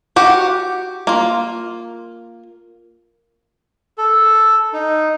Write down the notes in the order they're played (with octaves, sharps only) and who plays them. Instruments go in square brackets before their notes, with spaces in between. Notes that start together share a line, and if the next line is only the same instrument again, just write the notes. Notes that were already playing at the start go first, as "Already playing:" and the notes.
[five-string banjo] F#4 G4 F#5
A#3 F4
[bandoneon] A4
D#4